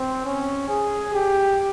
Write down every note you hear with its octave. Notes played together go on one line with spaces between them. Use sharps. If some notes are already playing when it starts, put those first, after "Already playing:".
Already playing: C4
C#4
G#4
G4